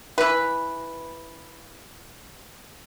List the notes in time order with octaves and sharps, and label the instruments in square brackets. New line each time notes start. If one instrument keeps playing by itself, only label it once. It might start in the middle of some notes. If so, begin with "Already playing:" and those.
[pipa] E3 B4